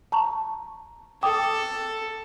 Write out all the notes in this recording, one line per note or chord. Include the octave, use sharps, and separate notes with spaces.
A5 A#5 C#6
A4 G5 D6 D#6